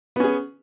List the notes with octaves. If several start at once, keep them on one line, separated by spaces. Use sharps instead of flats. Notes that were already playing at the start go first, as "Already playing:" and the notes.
B3 C#4 G#4